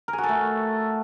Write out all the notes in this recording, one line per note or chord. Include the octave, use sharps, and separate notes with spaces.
A#4
G#4
F#4
A4
A3